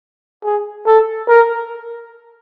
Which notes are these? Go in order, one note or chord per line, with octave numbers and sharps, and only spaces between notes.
G#4
A4
A#4